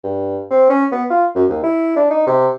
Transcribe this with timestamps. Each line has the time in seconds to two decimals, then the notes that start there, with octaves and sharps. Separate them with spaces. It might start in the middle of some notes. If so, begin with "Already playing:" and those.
0.04 G2
0.51 C4
0.70 C#4
0.92 B3
1.10 F4
1.35 F#2
1.50 D#2
1.64 E4
1.96 D4
2.10 D#4
2.27 C3